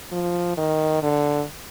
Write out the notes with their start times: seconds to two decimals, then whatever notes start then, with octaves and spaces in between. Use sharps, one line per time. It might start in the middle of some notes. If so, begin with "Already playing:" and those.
0.12 F3
0.57 D#3
1.02 D3